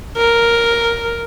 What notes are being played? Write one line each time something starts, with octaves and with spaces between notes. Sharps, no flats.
A#4